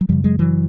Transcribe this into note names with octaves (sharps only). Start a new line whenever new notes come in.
F#3
F#2 C#3 F3 G3
F#3 G#3
E3 F#3